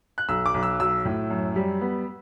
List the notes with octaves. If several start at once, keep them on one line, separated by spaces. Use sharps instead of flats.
F#6
B1 E6
D6
B1
E6
F#3 E6
A2
F#2
G3
B3